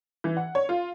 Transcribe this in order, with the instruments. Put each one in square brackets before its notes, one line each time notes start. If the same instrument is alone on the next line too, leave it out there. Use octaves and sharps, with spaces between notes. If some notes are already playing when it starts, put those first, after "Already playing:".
[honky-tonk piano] E3
F#5
C#5
F4